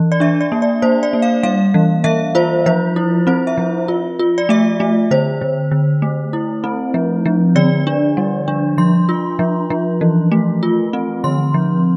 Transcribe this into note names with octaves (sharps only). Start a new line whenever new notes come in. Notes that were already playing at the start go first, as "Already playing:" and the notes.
Already playing: E3
D5
D4 E5
D5
A#3
D5
A#3 C5
D5
A#3
F5
G3 F5
E3
E3 E5
F4 C5
F3 C5
E4
C4 C5
E5
F3
F4
F4
D5
A3 E5
A3
D3 C5
D3
D3
A3
E4
C4
F3
F3
D3 D5
D4
G3
D4
F3 C6
F4
F3
F3
E3
A3
F4
C4
D3 C6
F3